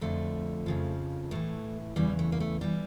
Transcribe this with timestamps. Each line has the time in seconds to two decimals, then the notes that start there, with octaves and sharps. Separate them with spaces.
0.01 F2 D3 F3 A3
0.66 F2 C#3 F3
1.31 A2 E3 A3
1.96 E2 C#3 E3 G3
2.19 A3
2.32 A#3
2.40 A3
2.61 E3 G3